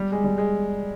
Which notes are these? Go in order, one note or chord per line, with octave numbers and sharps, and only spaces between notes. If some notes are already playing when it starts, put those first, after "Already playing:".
Already playing: G3
G#3
G3
G#3